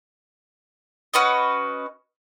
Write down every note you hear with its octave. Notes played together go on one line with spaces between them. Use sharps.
C#4 F#4 B4 D#5